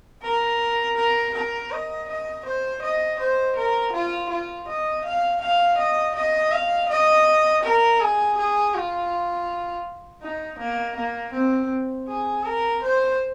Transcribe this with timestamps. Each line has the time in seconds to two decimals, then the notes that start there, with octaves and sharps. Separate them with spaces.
0.22 A#4
0.96 A#4
1.34 A#4
1.71 D#5
2.08 D#5
2.45 C5
2.82 D#5
3.19 C5
3.56 A#4
3.93 F4
4.30 F4
4.68 D#5
5.05 F5
5.41 F5
5.78 D#5
6.15 D#5
6.52 F5
6.89 D#5
7.63 A#4
8.00 G#4
8.37 G#4
8.74 F4
10.22 D#4
10.59 A#3
10.96 A#3
11.33 C4
12.08 G#4
12.44 A#4
12.82 C5